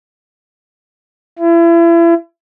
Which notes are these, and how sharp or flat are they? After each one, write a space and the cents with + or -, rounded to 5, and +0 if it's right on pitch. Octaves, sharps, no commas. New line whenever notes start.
E4 +35